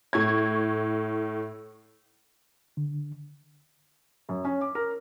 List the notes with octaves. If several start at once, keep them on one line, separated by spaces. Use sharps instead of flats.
A2 C#6 G#6
D3
F#2
C#4
D6
A#4